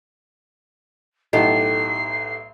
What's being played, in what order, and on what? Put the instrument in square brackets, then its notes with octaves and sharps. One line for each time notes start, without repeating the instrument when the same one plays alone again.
[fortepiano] B1 A2 F#5 [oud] G4 A4 [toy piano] D#5 [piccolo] C7